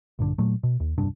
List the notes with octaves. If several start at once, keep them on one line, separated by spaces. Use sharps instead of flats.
A#1 G2 D3
A#2 F#3 A3
B2
D#2
E1 C2 G2 D4